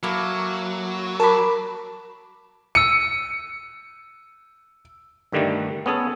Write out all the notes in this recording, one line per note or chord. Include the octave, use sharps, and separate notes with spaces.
F#3 A#3 E4 A4
A#4 A5 B5 D6
E6 C#7 D#7
G2 D3 D#3 G3 A3
B3 C#4 G#4 A4